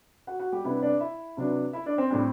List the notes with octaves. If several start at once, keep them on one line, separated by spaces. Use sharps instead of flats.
F#4 F#5
F#4 F#5
G3 G4
C3 G3 B3 D4 E4
D4 D5
E4 E5
C3 F#3 B3 D4
E4 E5
D4 D5
C4 C5
A2 G3 C4 D4